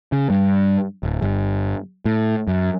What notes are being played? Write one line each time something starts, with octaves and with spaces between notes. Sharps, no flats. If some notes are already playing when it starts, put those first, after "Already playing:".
C#3
G2
D1
G1
A2
F#2